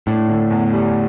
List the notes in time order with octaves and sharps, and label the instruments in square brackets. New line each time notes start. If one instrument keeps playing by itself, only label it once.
[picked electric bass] A2 [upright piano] D4
[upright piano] D3
E2
G3